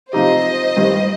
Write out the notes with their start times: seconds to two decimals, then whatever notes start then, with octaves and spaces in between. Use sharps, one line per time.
0.13 C3 F3 C4 D#4 G4 C5 D#5
0.77 G2 D#3 G3